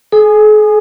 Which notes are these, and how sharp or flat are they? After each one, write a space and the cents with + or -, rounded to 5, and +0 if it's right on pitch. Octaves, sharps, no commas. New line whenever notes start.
G#4 +45 G#5 +0 D#6 -25